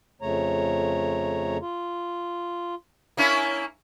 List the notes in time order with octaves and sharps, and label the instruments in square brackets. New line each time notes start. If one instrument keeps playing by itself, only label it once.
[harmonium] F2 C#3 A3 C#5 A#5
F4
[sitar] A#3 C#4 E4